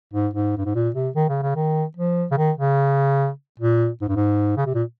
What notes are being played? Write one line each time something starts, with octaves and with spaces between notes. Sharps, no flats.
G#2
G#2
G2
G#2
A#2
C3
D#3
C#3
C#3
D#3
F3
C#3
D#3
C#3
A#2
G#2
G2
G#2
C#3
C3
A#2